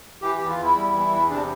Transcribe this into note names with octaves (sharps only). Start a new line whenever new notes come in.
E3 G4
E2 G4
F4
E2 E4
G3
E3
E2
C3 D4